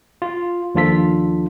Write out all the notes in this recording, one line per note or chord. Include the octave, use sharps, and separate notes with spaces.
F4
D#2 F3 D4 F4 A4 B6